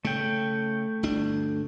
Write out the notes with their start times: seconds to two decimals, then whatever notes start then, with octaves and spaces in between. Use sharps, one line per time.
0.05 C#3 A3 G5
1.03 G1 D2 D4